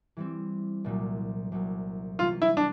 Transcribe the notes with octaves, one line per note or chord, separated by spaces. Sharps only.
E3 G3 C4
C2 A#2 F#3
C2 A#2 F#3
C3 E3 G3 A#3 C#4 F4
E4
D4